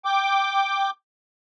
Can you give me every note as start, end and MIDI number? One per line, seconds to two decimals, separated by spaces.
0.05 0.90 79
0.05 0.90 86